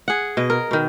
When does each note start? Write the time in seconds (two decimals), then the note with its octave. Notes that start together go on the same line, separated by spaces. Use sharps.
0.08 G#4 F#5
0.37 B2 D#5
0.50 A#4
0.71 B2 D#3